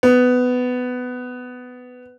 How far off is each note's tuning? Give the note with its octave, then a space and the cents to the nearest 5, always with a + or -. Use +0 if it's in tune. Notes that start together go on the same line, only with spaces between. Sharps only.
B3 +15